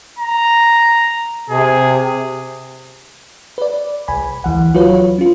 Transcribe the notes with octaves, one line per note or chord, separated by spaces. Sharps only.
A#5
C3 G#4
B4 D5
C2 G#5 B5
D2 E3 F#5
F#3 F4 F#4 B4 C#5
C#4 F4